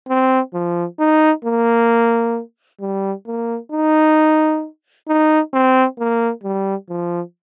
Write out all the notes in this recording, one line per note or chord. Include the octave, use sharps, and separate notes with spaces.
C4
F3
D#4
A#3
G3
A#3
D#4
D#4
C4
A#3
G3
F3